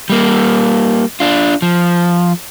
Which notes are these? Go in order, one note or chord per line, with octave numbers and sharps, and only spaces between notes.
G3 A#3
D4 F4
F3